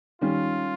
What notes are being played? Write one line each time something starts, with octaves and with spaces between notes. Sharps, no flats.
D#3 G3 C#4 F4